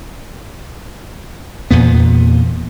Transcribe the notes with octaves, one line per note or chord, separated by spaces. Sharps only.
E2 A#2 B3